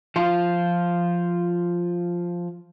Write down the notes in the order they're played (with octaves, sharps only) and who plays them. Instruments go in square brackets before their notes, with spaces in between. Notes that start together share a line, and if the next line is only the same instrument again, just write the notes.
[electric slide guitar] F3 F4